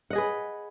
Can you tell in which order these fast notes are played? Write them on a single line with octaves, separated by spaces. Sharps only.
F#5 D#5 G#4 B4